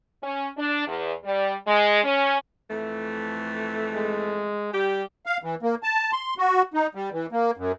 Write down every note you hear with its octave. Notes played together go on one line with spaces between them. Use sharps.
C#4
D4
E2
G3
G#3
C#4
F2 E3 A3
G#3
G3 G4
F5
E3
A#3
A5
C6
F#4
D#4
G3
E3
A#3
F#2